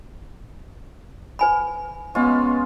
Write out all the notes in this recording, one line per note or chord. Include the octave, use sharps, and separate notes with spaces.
B4 G#5 B5
G#3 B3 C#4 F4